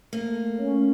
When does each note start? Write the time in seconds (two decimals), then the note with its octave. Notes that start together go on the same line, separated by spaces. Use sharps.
0.12 A3 A#3
0.58 C#4